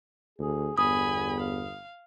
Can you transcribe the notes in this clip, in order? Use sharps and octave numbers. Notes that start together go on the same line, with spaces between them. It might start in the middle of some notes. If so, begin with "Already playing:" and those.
D2 G#4
G1 E2 G#5 B5 D#6
F5